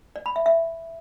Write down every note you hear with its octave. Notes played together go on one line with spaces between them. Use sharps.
D5
B5
E5
E5